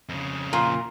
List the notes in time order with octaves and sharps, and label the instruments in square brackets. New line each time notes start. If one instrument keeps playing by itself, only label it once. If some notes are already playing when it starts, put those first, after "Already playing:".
[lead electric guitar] F2 C#3
[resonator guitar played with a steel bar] A#2 [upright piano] A#5 C6